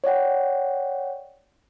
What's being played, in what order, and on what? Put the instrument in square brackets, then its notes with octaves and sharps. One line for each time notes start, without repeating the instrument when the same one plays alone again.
[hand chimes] C#5 D5 F#5 G5